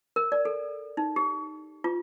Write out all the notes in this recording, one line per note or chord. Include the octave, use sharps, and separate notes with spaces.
A#4
D5
A4
D#4
G4
F4